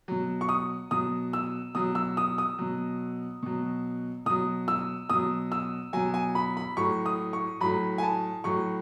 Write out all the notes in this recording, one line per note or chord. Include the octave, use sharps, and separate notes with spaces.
B2 F#3
C#6
D#6
B2 F#3 D#6
E6
B2 F#3 D#6
E6
D#6
D#6
B2 F#3
B2 F#3
B2 F#3 D#6
E6
B2 F#3 D#6
E6
B2 F#3 G#5
G#5
B5
B5
A2 F#3 C#6
D#6
C#6
A2 F#3 B5
G#5
A5
A2 F#3 C#6